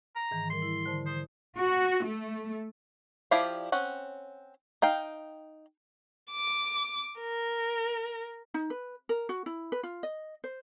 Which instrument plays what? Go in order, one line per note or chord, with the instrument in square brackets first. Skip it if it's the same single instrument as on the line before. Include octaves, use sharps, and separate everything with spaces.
[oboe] A#5
[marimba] G#2 D#3 E3
[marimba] G3 A#4 [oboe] C6
[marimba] E4
D3 C5 A5
[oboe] C5 [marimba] D#6
[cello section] F#4
A3
[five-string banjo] F3 E4 G4 D5 F5
C4 C#4 F#5
D#4 F5 G5
[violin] D6
A#4
[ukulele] D#4
B4
A#4
F#4
E4
B4
F4
D#5
C5